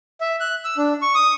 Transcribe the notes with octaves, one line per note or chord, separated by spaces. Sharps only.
E5
F#6
E6
D4
C#6
D#6